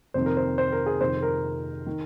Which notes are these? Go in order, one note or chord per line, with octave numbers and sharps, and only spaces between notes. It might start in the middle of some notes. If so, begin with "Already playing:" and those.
F2 C3 D#3 C5
A#4
C5
C5
A#4
G#4
F2 C3 D#3 C5
A#4
D#3